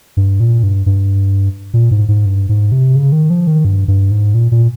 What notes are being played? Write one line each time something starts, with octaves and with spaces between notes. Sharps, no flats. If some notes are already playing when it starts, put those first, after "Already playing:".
G2
A#2
G2
G2
A#2
G#2
G#2
G2
G#2
C3
C#3
D#3
F3
D#3
G2
G2
G#2
A#2
A#2